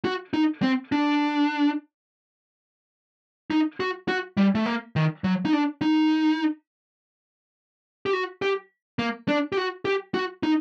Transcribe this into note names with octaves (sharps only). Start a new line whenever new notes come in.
F#4
D#4
C4
D4
D#4
F#4
F#4
G3
A3
A#3
D#3
F#3
D#4
D4
D#4
G4
F#4
G4
A#3
D4
G4
F#4
G4
F#4
D#4